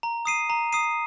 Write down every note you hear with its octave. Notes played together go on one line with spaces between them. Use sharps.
A#5
D#6 C7 D#7
A#5
D#6 C7 D#7